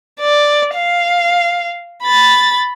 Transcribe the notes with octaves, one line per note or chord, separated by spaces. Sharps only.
D5
F5
B5 A6